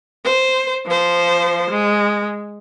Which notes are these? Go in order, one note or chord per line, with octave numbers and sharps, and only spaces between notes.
C5
F3 C5
G#3